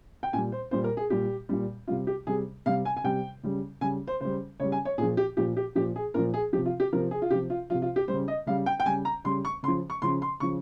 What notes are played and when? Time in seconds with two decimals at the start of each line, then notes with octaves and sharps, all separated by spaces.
0.23 G5
0.33 A#2 G3 G#5
0.52 C5
0.71 A#2 G3 C5
0.84 A#4
0.97 G#4
1.10 A#2 G3 G4
1.49 A#2 G3
1.88 C3 G3 F4
2.07 G4
2.27 C3 G3 G#4
2.66 C3 G3 F5
2.85 G#5
2.97 G#5
3.04 C3 G3 G5
3.43 C#3 G3
3.81 C#3 G3 G#5
4.07 C5
4.21 C#3 G3 C5
4.60 C#3 G3 C#5
4.72 G#5
4.85 C#5
4.98 A#2 G#4
5.03 F3
5.17 G4
5.37 A#2 F3 G4
5.57 G4
5.75 A#2 F3 G4
5.96 G#4
6.14 A#2 F3 A#4
6.34 G#4
6.53 F3 G4
6.58 C3
6.66 F4
6.80 G4
6.93 C3 F3 A#4
7.11 G#4
7.22 F4
7.31 C3 F3 G4
7.50 F4
7.70 F3 F4
7.74 C3
7.82 F4
7.96 G4
8.08 G3 C5
8.13 C#3
8.28 D#5
8.47 C#3 G3 F5
8.66 G5
8.80 G5
8.86 C#3 G3 G#5
9.05 A#5
9.24 C#3 G3 C6
9.45 C#6
9.63 C#3 C6
9.68 F3
9.90 C#6
10.02 C#3 F3 C6
10.22 C6
10.40 C#3 F3 C#6